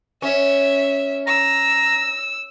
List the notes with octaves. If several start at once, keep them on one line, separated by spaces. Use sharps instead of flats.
C#4 E5
A#5 E6